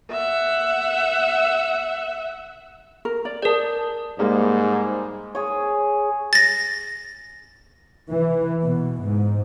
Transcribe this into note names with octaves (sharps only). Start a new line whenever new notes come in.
E5 F#5
A#4
D5
G#4 A#4 D5 A5
G#2 G3 G#3 A#3
G#4 C#5
A6 A#6
E3
B2
G#2